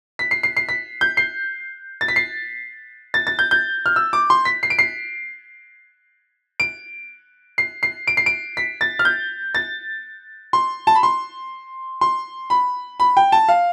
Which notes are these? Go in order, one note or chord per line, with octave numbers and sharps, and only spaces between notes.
B6
C7
C7
C7
B6
G6
C7
A6
B6
C7
A6
A6
G6
G6
F6
E6
D6
C6
B6
C7
D7
C7
D7
C7
C7
D7
C7
D7
B6
A6
F6
G6
A6
C6
A5
B5
C6
C6
B5
B5
G5
A5
F5